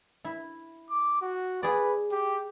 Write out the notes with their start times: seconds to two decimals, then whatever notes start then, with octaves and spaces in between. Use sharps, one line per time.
0.24 E4
0.90 D6
1.22 F#4
1.63 G#4 B4 D5
2.11 G4